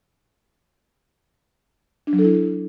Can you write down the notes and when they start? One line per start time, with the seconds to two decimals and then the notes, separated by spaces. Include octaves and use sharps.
2.07 D4
2.13 F#3
2.19 A4
2.24 E4